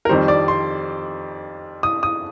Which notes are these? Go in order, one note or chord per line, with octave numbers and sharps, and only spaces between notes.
A#4
F2 D#3 G3 C5
D5
C6
D#6
D#6